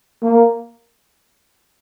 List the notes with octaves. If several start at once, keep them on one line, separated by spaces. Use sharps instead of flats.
A#3